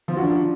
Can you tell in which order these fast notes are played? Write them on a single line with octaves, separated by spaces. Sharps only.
F3 F4 F#4 D4